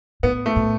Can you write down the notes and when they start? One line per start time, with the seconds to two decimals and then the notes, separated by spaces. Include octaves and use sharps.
0.23 A2 B3
0.46 A3
0.56 A2